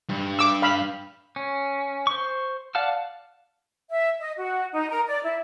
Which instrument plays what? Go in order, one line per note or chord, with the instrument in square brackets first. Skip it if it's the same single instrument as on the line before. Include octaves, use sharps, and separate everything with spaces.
[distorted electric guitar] G2
[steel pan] D6 E6
F5 B5 E6
[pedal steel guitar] C#4
C5 C#6
D5 F5 F#5 A5 F6
[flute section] E5
D#5
F#4
D#4
A#4
D5
E4